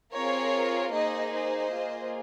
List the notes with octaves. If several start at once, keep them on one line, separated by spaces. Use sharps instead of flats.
C4 F4 G#4 A#4 C#5
A#3 D#4 G#4 C5 D#5
C5 D#5
A#3 F4 G#4